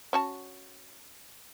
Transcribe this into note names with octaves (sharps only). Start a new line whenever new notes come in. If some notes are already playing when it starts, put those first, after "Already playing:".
C#4 F#4 A5